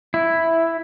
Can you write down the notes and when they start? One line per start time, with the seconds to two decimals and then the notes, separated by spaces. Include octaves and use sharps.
0.14 E4